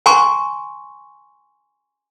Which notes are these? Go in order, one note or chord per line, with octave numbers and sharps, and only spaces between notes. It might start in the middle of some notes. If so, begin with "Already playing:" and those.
G#5 A#5 C6 C#6